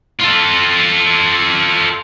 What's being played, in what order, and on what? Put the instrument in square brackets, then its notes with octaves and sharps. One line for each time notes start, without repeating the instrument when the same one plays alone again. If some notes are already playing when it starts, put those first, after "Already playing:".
[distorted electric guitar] F4 A4